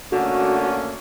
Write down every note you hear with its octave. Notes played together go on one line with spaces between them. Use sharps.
D3 A3 A#3 C#4 F#4